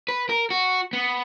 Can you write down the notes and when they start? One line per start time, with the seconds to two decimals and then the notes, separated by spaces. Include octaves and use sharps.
0.08 B4
0.29 A#4
0.50 F#4
0.93 B3